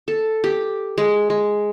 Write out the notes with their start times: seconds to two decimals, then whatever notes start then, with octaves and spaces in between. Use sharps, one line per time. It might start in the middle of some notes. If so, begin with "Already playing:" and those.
0.08 A4
0.44 G4
0.98 G#3
1.30 G#3